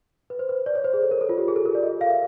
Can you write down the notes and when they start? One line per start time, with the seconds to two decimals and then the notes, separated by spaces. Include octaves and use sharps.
0.30 B4
0.39 C5
0.49 B4
0.66 D5
0.75 C#5
0.84 C5
0.94 G#4
1.02 A4
1.11 A#4
1.21 A4
1.29 F4
1.38 G4
1.48 G#4
1.56 A4
1.65 A#4
1.75 D5
1.83 D#5
2.01 F5
2.10 E5